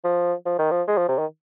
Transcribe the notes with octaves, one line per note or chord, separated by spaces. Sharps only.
F3
F3
D#3
F3
G#3
F3
C3
D#3